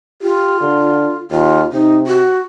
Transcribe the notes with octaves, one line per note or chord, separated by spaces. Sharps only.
F4 G4
D3
D#2 F4
C3 D#4
F#4